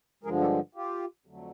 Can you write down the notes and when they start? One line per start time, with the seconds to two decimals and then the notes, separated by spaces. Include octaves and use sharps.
0.23 G2 D3 F3 G#3 G#4 A#4
0.41 G4 A4
0.75 F4 G4
1.26 F2 D3 F#3 A3